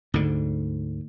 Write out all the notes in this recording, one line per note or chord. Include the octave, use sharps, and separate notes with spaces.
D2 G#2 D3